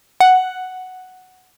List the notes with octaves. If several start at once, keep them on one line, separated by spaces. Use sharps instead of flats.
F#5